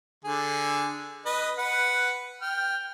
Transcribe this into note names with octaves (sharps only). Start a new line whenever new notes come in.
D3 G#4
B4 D#5
B4 F#5
G5 F6